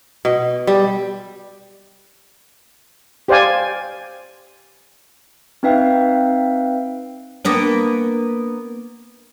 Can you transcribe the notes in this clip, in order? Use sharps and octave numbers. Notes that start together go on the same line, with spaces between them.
B2
G3
G4 C5 D5 F5 G#5
C4 D#4 B4 E5 F5 G5
A#3 B3 D4